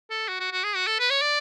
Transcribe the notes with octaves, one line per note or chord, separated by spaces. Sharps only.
A4
F#4
F#4
F#4
G#4
F#4
A4
B4
C#5
D5